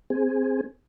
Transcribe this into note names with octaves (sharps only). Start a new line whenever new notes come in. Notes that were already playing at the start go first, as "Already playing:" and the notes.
C4 G#4